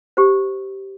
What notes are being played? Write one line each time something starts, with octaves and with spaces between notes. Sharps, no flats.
G4 C5